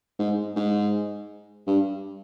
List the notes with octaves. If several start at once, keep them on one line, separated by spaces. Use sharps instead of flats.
G#2
G#2
G2